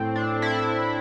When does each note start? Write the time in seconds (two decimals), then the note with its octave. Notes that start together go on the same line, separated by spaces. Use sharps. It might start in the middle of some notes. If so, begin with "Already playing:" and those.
Already playing: A2 C4
0.16 D4
0.42 E4